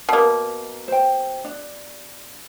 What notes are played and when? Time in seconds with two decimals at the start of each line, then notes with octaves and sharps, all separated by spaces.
0.09 B2 A#3
0.88 C5 G5
1.44 D4